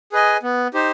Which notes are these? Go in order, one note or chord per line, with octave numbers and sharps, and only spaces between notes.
G#4 B4 D#5 G#5
B3
D#4 G4 C5